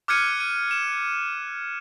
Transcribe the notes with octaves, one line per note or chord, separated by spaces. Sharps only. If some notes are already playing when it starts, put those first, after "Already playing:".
D6 F6 F#6 G#6 C#7 D#7
D#7
E7